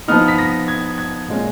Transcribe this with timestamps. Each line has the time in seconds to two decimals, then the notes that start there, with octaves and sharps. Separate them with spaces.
0.08 F3 B3 D#4 F6
0.28 B6
0.38 A#6
0.68 G#6
0.98 G#6
1.28 A#2 G#3 C#4